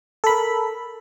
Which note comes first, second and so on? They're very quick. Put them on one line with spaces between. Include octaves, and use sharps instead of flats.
A4 B5 A#4